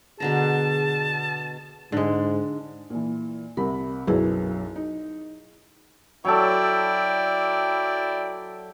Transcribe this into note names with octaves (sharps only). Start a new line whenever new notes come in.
B2 D3 G#4 A5 A#5
G#2 D3 G#3
A#2 E3
C2 C3 A#4 B5
B1 F#2 E4 G#4 B4
D#4
F#3 E4 A4 D5 G5